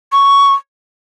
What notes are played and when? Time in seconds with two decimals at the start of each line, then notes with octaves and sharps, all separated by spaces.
0.12 C#6